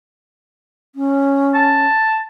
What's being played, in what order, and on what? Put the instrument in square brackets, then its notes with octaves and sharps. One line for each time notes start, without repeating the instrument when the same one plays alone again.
[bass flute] C#4
[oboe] A5